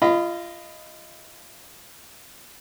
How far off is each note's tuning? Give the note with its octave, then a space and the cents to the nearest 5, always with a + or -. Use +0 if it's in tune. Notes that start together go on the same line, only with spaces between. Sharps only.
F4 -25 D#5 +0 B5 +20